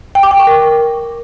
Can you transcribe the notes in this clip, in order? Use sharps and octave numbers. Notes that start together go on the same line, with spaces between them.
G5
D6
G5
C#6
A#4